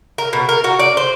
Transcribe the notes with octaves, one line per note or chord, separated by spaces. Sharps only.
A#4
B2
A#4
F#4
D5
C5